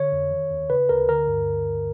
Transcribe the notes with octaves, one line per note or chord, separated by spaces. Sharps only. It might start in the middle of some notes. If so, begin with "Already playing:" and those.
Already playing: D3 C#5
F2
D#3
D#2
C#3 B4
D2 A#4
D3 A#4
G2